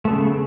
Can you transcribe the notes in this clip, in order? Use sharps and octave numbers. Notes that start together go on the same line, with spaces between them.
C#3 A3 B3